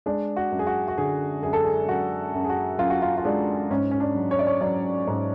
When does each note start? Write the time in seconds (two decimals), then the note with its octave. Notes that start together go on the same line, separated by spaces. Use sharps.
0.06 G#3 D4
0.36 F#4
0.51 F#2
0.59 G#4
0.67 F#4
0.88 F#4
0.98 D3 G#4
1.42 F#2 G#4
1.53 A4
1.65 G#4
1.88 F#2 F#4
2.34 F#2
2.44 G#4
2.49 F#4
2.79 F#2 F4
2.90 F#4
3.02 F4
3.17 F4
3.25 G#3 D4
3.71 G#2 C#4
3.91 C#4
4.00 D4
4.15 F#3
4.31 C#5
4.39 D5
4.47 C#5
4.61 F#3 D5
5.07 G#2